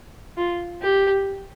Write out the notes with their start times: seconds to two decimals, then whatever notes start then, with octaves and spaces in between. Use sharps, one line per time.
0.37 F4
0.82 G4